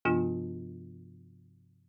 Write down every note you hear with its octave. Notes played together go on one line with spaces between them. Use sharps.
G2 C3 F3 B3 D4 F4